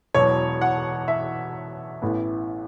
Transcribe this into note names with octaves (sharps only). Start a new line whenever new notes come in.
E1 E2 B2 F#3 C#5
F#5
E5
A1 A2 E3 B3